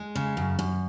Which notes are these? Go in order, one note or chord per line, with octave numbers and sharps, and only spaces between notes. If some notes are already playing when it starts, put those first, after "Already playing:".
Already playing: G#3
C#3
F#2
F#2